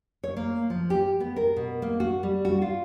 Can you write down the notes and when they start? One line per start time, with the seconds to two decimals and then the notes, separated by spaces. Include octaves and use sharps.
0.23 C#5
0.37 A#3
0.70 F3
0.90 G4
1.20 B3
1.36 A#4
1.56 B2
1.82 A#3
2.00 F#4
2.23 G3
2.45 F#4
2.62 F4